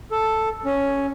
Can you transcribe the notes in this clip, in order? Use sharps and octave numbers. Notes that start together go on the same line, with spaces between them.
A4
C#4